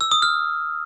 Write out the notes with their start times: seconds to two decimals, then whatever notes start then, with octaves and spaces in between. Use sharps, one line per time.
0.01 E6
0.11 D#6
0.22 F6